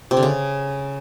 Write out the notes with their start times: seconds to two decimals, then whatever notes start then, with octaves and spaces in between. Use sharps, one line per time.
0.11 C3
0.17 D3
0.23 C#3